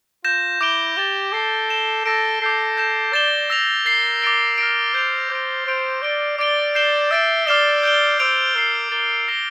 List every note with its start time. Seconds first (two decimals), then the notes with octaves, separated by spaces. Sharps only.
0.25 F4 G6 A#6 E7
0.61 E4 D6 G6 D7 G7
0.97 G4 A6 E7 G7
1.33 A4 D6 A6 C7
1.69 A6 E7 G7
2.05 A4 E6 A#6 D7
2.42 A4 D6 G6 C7
2.77 G6 A#6 E7
3.13 D5 A6 E7 G7
3.50 E6 A#6 F7
3.86 A#4 A6 C7 G7
4.22 D6 A6 D7 G7
4.58 F6 A#6 D7
4.94 C5 G6 D7 F7
5.30 C5 D6 G6 D7
5.67 C5 G6 D7 F7
6.02 D5 A6 D7 G7
6.38 D5 D6 A6 D7 G7
6.75 G6 C7 E7 G7
7.11 E5 E6 A6 D7
7.47 D5 D6 F6 C7 E7 G7
7.83 G6 D7 G7
8.20 C5 E6 G6 D7 F7
8.55 A#4 E6 G6 C7
8.91 A#4 D6 A6 E7 G7
9.28 E6 A#6 E7 G7